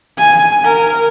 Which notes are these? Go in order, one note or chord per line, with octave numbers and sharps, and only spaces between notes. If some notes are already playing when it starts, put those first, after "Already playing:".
G#5
A#4